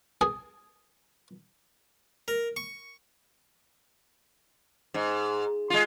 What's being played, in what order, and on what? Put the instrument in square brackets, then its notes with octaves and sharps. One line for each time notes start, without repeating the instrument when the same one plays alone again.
[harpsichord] G#4
A#4
C#6
[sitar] G#2
G#3 F4